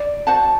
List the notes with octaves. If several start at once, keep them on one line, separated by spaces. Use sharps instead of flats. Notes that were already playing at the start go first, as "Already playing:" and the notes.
Already playing: D5
F#4 C5 F#5 A5